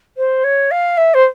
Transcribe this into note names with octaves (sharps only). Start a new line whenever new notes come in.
C5
C#5
F5
E5
C5